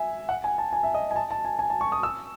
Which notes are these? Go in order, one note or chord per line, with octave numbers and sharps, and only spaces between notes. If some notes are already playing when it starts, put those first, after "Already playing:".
Already playing: E5 G#5
F#5
G#5
A5
G#5
E5
D#5
G#5
A5
A5
G#5
G#5
A5
C#6
D#6
E6